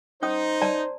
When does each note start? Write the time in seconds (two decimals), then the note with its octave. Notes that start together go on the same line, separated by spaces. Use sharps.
0.23 C#4 D#4 C5 D#6
0.62 D5 A5 A#5